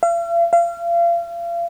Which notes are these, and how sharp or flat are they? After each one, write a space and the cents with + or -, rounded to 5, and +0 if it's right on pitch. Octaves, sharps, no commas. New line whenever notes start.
F5 -45
F5 -35